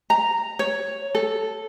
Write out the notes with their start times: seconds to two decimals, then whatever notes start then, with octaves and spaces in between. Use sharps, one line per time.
0.10 A#5
0.59 C#5
1.15 A4